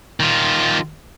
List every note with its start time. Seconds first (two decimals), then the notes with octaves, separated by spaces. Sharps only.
0.20 D#3 F4